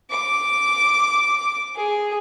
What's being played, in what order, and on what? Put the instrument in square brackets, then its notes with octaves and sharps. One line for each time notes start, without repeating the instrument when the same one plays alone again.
[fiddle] D6
G#4